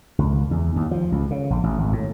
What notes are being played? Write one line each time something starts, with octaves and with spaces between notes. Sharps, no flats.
C#2
E2
D#2
F3
C#2
C#3
A#1
A1
G#1
A2